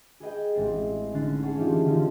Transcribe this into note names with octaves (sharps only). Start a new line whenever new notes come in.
G#4 B4 D#5 G5
A1 G#3 C4 A6 C7
D3 C#4 D#4 F#6 A6 C7
G#4 C#5 F#5 G#5 A5
E3 D#4 F4 G4 D5
D3 D#3 C#4 D#4 F4